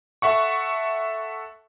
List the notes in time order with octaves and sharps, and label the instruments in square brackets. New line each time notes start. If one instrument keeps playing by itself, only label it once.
[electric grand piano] A4 E5 F#5 C#6